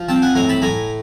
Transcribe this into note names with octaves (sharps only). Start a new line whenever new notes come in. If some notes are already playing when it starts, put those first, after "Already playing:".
Already playing: F3
C4 G5 A5
F#5 G#5
A2 G#5 A#5
A5 B5
A2 G#5 A#5